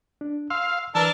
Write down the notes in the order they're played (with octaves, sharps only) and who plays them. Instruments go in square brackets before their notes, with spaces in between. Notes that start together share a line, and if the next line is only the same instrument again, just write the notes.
[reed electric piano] D4
[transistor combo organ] F5 [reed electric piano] C6 E6
[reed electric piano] E3 B4 [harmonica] D4 A#4 A5 [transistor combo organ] E6